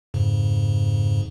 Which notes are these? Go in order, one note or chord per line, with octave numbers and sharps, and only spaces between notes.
F2 G#2 C#3